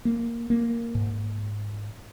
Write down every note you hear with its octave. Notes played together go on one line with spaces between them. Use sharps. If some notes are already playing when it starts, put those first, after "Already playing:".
A#3
A#3
G#2